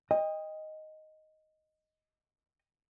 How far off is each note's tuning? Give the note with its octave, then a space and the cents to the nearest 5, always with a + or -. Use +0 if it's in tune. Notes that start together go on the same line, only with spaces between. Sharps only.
D#5 +0 G5 +35